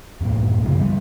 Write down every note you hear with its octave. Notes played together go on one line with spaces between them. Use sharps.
F#2 A2 F#3 A#3
C2 G2 C#3 F3
G3 B3